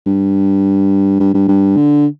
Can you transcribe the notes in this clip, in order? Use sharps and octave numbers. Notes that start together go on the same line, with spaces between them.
G2
G2
G2
G2
D3